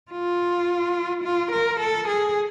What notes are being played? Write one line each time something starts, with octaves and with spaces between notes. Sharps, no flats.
F4
F4
A#4
A4
G#4